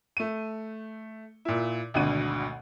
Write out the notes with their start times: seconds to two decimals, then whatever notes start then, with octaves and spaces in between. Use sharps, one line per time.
0.17 A3 D#7
1.45 A#2 E4
1.94 G#1 D2 B2 D3 D4 D#7